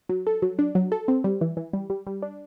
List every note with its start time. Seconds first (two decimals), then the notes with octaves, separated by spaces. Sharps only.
0.09 F#3
0.27 A4
0.42 F#3
0.59 D4
0.75 F#3
0.92 A4
1.08 C4
1.24 G3
1.41 E3
1.57 E3
1.73 G3
1.90 G3
2.07 G3
2.22 D4